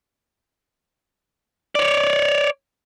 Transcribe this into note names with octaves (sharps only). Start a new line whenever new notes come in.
C#5 D5